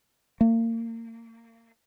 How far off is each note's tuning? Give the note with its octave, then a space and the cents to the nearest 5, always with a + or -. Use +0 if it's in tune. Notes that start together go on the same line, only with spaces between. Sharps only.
A#3 -35